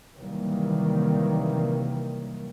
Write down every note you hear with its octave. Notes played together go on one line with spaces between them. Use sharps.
C3 D#3 E3 F#3 G3 A#3